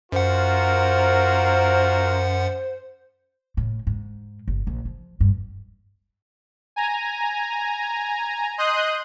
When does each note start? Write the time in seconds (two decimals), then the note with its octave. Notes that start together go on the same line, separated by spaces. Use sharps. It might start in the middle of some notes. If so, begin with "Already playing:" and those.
0.12 F#2 F4 F#4 A#4 C5 F#5
3.57 A2
3.87 G#2
4.48 G1
4.67 A#1
4.85 F3
5.20 G2
6.76 G#5 A#5
8.58 D#5 C6 D#6 F#6 G6